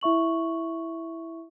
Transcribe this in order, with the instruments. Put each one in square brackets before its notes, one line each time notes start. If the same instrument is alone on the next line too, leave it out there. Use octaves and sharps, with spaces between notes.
[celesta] E4 E5 C#6 F#7